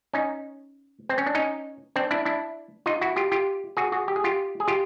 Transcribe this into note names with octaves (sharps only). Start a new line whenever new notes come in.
C#4 D#4
C4
C#4
D4
C#4 D#4
C4 D4
D4 E4
D4 E4
D#4 F4
E4 F#4
F4 G4
F4 G4
F#4 G#4
F#4 G#4
G4
G#4
F4 G4
G#4
F4 G4